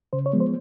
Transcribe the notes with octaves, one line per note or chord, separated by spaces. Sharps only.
C#3 C5
C#5
F3 G#3 B3
C5